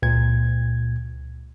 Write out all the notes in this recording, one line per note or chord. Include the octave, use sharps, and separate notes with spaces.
C#2 A#2 G#6